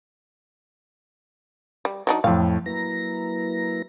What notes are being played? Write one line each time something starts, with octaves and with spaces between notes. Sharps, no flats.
G3
F#3 D4 D#4
F2 A2 F5
F#3 A#3 E4 B4 A#5 A#6